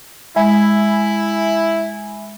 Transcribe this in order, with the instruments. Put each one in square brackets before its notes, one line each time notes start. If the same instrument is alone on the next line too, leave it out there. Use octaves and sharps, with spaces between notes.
[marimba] G#3 [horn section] E4 [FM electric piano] E5 G#5 B5